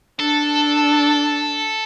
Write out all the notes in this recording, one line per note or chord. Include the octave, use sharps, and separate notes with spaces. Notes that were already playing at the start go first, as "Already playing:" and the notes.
D4 A4